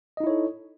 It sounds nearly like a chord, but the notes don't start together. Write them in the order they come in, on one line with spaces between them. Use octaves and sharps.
D#5 D#4 E4 C#5 A4